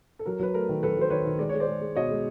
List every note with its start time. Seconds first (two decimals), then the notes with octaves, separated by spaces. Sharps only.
0.19 A4
0.26 F#3 A#4
0.39 F#3 B4
0.54 A3 A#4
0.69 D#3
0.83 F#3 A4 B4
0.97 F#3 C5
1.10 D#3 B4 C#5
1.26 D#3
1.39 G#3 D5
1.49 G#3 C#5
1.60 C5 D5
1.67 G#3
1.81 G#3
1.96 B2 C#5 D#5
2.11 G#3